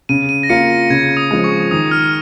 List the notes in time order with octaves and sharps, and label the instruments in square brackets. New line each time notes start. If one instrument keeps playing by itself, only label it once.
[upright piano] C#3 [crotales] D#7
[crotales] D#7
A#6
[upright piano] A#3 F4 [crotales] C#7
[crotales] A#6
[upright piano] C#3 [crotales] G#6
[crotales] D#6
[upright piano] F3 G#3
[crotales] C#6
[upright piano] D#3 [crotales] D#6
[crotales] F6